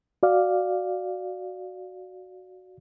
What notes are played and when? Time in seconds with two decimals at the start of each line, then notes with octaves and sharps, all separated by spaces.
0.23 F#4 D5 F5